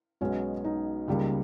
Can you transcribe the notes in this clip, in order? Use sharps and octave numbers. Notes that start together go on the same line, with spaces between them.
B1 B2 G#3 B3 C#4
D#4
C#2 C#3 G3 A#3